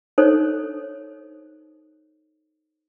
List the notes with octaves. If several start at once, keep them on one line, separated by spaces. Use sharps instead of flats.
D#4 A4 C5 C#5